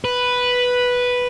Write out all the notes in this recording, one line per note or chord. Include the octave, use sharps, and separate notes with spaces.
B4